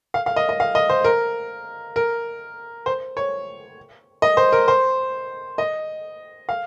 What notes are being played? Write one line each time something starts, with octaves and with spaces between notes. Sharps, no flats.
F5
F5
D#5
D#5
F5
D#5
C5
A#4
A#4
C5
C#5
D#5
C5
A#4
C5
D#5
F5